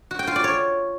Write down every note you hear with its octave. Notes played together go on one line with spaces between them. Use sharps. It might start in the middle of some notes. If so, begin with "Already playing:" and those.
F#4
G5
F4
D5
C#5